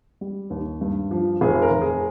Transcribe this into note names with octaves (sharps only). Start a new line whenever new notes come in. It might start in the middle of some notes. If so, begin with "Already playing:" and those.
G3
D#2
G2
F3
F1 G#4
A#4
F1
G#4